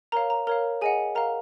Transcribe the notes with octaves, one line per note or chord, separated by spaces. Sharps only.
A#4 C#5 F5 A#5
A#5
A#4 C#5 F5 A#5
G#4 D#5 F#5 G#5
A#4 F5 A#5